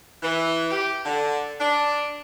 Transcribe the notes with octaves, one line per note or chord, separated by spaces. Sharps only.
E3
G4
D3
D4